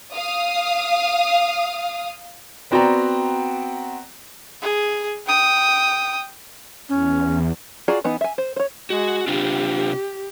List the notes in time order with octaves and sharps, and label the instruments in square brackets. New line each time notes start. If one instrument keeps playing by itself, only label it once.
[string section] F5 D#6
[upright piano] B3 C4 F#4 D5 G5 A#5
[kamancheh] G#4
G5 D#6
[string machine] E2 [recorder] C#4
[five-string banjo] F4 F#4 G#4 D5 A#5
E3 B3 D#4
E5 G#5
C5
C5 C#5
[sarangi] G#3 [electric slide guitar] F#4
[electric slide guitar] C3 D4 F4 [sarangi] G4